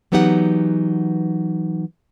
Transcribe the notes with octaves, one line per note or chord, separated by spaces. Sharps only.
E3 F#3 B3 D#4 G4 F#5